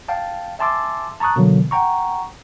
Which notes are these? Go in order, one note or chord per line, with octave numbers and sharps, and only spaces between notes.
F5 G5 A5
E5 G#5 A5 C6 D6 E6
A5 A#5 C#6 D#6 F#6
B2 D3 E3 F#3 A#3
F#5 G5 A#5 C#6